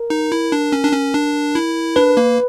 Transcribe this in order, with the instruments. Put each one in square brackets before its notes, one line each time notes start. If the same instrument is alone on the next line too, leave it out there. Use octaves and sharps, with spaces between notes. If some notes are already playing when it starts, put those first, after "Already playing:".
Already playing: [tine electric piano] A#4
[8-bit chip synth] D#4
E4
D4
C#4
D4
C#4
D4
E4
[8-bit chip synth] D4 [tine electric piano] B4
[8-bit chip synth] A#3